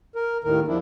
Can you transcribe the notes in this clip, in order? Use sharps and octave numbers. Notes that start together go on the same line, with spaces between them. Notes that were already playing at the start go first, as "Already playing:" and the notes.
A#4
D#2 A2 D#3 A#4
E2 F3 D4 E4